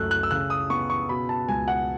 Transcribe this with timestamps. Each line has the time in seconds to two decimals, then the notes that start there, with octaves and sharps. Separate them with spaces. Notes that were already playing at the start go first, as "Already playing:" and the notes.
Already playing: C#2 F#2 A3 E6 F#6
0.11 F#6
0.23 E6
0.31 C#3 F#6
0.50 D#6
0.70 B3 C#6
0.90 C#6
1.09 B2 B5
1.29 A5
1.48 C#2 G#5
1.68 F#5